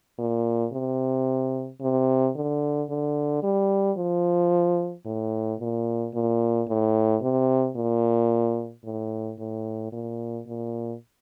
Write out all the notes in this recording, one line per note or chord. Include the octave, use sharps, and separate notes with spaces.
A#2
C3
C3
D3
D3
G3
F3
A2
A#2
A#2
A2
C3
A#2
A2
A2
A#2
A#2